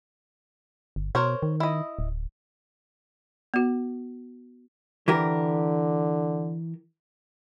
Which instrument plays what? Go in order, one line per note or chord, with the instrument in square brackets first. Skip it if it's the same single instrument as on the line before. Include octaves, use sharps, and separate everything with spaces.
[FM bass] G1
[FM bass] B2 [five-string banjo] A#4 C5 C#5
[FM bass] D#3
[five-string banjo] E4 D#5
[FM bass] D1
[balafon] B3 F#4
[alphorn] D3 [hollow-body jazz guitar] E3 G4 A#4